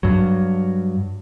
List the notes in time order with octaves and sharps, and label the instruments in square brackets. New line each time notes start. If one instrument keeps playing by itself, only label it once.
[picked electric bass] G2 F#3